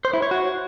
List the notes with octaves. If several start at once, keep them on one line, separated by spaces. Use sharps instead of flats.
C5
E4
C#5
F#4